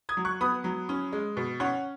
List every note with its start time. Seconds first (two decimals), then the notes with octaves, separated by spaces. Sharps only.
0.09 D#6 G#6
0.17 F#3
0.25 C#6 F#6
0.41 B3 B5 D#6
0.64 F#3
0.89 C#4
1.12 G#3
1.37 B2
1.60 C#4 C#5 F#5